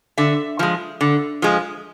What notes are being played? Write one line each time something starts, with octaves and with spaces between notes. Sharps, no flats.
D3 E5
F3 G#3
D3
F3 G#3